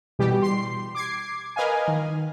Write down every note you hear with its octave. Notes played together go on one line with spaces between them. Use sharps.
B2 E3 G3 G4
C6 C7
D6 G#6 C7
A#4 B4 D#5 F5 G#5
D#3